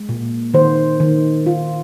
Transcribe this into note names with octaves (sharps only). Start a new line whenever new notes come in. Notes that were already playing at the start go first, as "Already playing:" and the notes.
Already playing: G#3
A#2
D#3 C5
D#3
D#3 F4